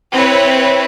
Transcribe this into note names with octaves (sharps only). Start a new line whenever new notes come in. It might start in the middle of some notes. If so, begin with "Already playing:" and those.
C4 E4 B4 C#5